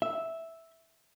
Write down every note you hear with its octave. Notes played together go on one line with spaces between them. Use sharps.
E5